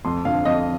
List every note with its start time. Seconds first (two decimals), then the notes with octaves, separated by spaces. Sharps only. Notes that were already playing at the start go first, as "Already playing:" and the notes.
0.05 F2 C6
0.25 D3 F3 F5
0.45 F2 D#5